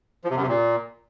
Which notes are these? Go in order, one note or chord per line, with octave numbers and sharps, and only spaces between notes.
F3
C3
F#2
C3
A#2